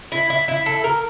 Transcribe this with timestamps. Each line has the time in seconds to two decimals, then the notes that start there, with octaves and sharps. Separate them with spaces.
0.12 E4
0.30 E4
0.48 E4
0.66 A4
0.84 A#4